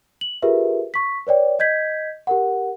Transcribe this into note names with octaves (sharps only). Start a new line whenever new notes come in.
F#7
F4 G4 G#4 A#4 B4 E5
C#6 B6
B4 C#5 D5 G5
D#5 G6 G#6 B6
G4 A#4 F#5